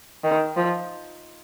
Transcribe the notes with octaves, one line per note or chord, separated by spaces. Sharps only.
D#3
F3